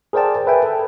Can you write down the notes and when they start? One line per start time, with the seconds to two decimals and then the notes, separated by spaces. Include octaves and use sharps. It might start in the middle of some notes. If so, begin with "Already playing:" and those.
0.13 G#4 A#4 C5 D5 G5 A5
0.47 B4 E5 G5 G#5
0.63 A4